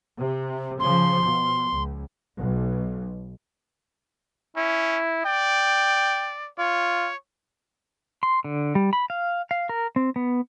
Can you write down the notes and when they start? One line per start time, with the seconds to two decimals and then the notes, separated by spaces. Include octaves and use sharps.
0.20 C3
0.80 C#3 F3 C6
1.22 B2
1.72 C#2
2.38 B1
4.56 C#4 E4
5.25 D5 G5
6.58 F4 C#5
8.23 C6
8.44 D3
8.75 G3
8.93 B5
9.10 F5
9.51 F5
9.69 A#4
9.96 C4
10.16 B3